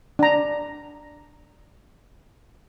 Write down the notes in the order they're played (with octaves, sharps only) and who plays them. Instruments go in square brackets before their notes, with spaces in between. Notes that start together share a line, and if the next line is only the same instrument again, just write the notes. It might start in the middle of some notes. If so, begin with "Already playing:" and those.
[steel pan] D4 A#5